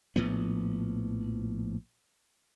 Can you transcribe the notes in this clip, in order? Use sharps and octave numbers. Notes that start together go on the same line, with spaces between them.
A#1 A2 F3 B3